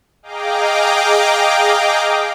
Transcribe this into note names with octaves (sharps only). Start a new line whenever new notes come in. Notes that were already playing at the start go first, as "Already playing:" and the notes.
G#4 D#5 F5 G5 A#5 D6